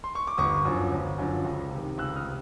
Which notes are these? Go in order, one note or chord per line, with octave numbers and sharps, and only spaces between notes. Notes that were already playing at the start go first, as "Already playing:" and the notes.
C6
C#6
D6
G1 C#6 D#6
F#2 D3 F3
G1
F#2 D3 F3
C#2
C3
D#3
C#2 E6 F#6
D#6 F6
C3